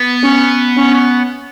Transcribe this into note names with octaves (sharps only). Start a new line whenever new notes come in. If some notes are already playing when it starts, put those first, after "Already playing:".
Already playing: B3
C#4
C#4